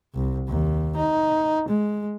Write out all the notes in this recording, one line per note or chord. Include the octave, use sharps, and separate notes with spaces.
C2
D#2
D#4
G#3